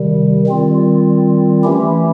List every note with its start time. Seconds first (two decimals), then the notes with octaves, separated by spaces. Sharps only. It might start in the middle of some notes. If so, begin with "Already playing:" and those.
Already playing: C3 D#3 G3
0.46 D#3 G3 C4 F4
1.64 E3 A3 C#4 E4 G4